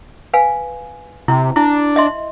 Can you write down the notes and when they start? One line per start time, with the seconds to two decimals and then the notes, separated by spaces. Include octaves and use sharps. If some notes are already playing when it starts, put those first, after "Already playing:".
0.34 B4 F5 G#5
1.28 C3 E4
1.56 D4 E4
1.96 D#5 E5 C6